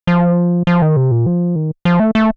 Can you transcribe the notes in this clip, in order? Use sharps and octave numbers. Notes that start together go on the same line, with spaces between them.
F3
F3
D#3
C3
A#2
F3
D#3
F3
A3
A3